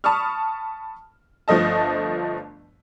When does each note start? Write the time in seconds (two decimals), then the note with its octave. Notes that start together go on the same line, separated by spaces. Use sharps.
0.04 A5 B5 C#6 D#6 F6
1.48 G1 F3 A3 D#5 A5